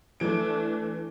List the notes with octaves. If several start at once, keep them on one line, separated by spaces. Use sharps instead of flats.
E3 A3 D4 D7